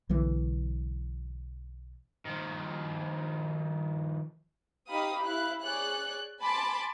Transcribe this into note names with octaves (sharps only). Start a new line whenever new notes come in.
B1 D3 E3
D#3 F3
D#4 G4 F5 B5 D#6
E4 F5 F#6
G#4 C#5 D5 F#6
G#5 A5 B5 C6 D6 A6